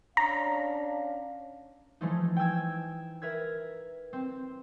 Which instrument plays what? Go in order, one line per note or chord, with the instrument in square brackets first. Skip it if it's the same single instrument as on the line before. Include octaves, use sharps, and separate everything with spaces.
[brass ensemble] C#4 D4 F5 [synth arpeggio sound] A#5
[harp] E3 F3 G#3 A3 D#4
G5 G#5 E6 G#6
A#4 B4 E5 G#6
C4